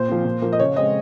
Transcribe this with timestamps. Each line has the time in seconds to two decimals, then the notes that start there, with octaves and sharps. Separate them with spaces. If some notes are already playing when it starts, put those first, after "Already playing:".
Already playing: A#2 C5
0.08 F3 C4
0.25 A#2
0.42 F3 A#3
0.53 D#5
0.60 C#3 C#5
0.76 G#3 C4 D#5